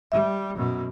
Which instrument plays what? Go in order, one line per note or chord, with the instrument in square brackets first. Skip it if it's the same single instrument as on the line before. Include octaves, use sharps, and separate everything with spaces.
[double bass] G3 [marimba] E5
[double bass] F#2 B2